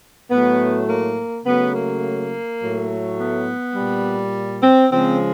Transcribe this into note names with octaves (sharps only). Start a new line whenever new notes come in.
A2 F#3 A3 B3
A#3
C#3 F#3 A3 B3
A#3
A2 F#3 A3
B3
A#2 G3
C4
C#3 F3 G#3 C4